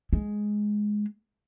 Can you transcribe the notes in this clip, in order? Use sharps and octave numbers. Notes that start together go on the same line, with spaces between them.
G#3